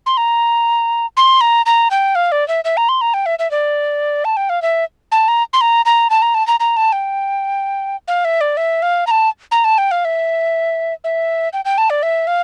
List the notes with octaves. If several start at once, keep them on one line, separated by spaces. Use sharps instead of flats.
C6
A#5
C6
A#5
A#5
G5
F5
D5
E5
E5
A#5
C6
A#5
G5
E5
E5
D5
A5
G5
F5
E5
A5
A#5
C6
A#5
A#5
A5
A#5
A5
A#5
A#5
A5
G5
F5
E5
D5
E5
F5
A#5
A5
A#5
A5
G5
F5
E5
E5
G5
G5
A5
D5
E5
F5